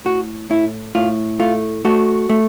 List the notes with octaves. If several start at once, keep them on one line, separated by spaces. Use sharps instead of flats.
A2 F#4
A2 E4
A2 F4
A3 F4
A3 F#4
A3